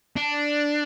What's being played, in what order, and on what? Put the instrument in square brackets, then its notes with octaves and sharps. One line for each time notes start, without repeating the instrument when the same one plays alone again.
[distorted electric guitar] D4